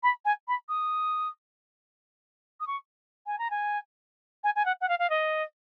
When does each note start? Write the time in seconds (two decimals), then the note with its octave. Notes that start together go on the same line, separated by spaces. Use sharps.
0.03 B5
0.25 G#5
0.48 B5
0.69 D#6
2.60 D#6
2.67 C#6
3.26 G#5
3.38 A#5
3.50 G#5
4.44 G#5
4.56 G#5
4.65 F#5
4.81 F#5
4.88 F5
4.99 F5
5.10 D#5